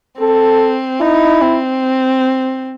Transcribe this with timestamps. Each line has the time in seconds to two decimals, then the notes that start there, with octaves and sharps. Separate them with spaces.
0.19 C4 A4
1.00 D#4 E4
1.42 C4